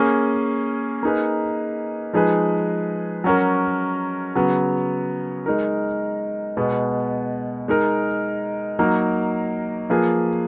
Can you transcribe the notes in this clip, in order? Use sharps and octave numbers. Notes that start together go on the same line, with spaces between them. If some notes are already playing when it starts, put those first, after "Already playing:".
Already playing: A#3 C#4 G#4
A#3 D#4 G#4 B4
F3 G#3 D#4 G#4 B4
F#3 C#4 F#4 A#4
C#3 F#3 B3
G#3 D#4 A#4
B2 G#3 B3
G#3 D#4 A#4
F#3 A#3 D#4 A#4
F3 A#3 F4 G#4 B4